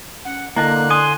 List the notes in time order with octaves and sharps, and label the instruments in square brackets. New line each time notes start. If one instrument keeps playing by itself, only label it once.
[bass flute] C#4 [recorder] F#5
[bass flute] D3 [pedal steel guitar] A#3 [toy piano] E4 D#5 A5 [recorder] F#6
[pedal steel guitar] G#5 C6 [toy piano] D#6